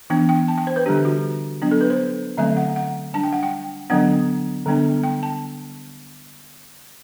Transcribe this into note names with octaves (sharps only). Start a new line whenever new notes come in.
E3 B3 D4 G5
G5
A5
G5
C5
B4
D3 G3 D4 G4
F#4
F#3 B3 D4
A4
B4
C5
D3 F#3 A3 C4 E5
F#5
F#5
G3 D4 A5
G5
F#5
G5
D3 F#3 B3 D4 F#5
D3 G3 B3 D4
G5
A5